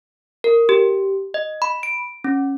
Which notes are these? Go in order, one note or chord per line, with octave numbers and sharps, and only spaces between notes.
A#4
G4
D#5
B5
D7
C#4